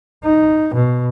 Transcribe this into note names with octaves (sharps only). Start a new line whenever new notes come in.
D#4
B2